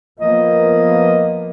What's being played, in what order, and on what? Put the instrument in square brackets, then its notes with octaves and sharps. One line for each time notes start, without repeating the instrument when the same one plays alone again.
[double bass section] F3 A#3 B3 [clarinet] D#5